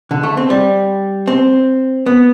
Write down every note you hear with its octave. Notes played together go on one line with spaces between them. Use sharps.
D3
A3
C4
G3
C4
B3